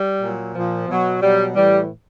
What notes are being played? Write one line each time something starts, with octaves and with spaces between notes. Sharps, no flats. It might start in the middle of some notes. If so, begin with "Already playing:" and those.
Already playing: G3
A#2 F#3
A#2 F3
B2 F#3
B2 F#3 G3
A2 E3 G3